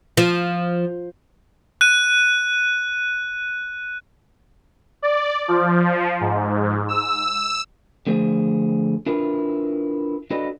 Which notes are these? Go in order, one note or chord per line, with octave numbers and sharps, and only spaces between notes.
F3
F#6 D#7
D5
F3
G#2
E6
D3 F3 A3 G#4 C5
D4 E4 F4 A#4 B4
D4 F#4 A4 B4 D5 D#5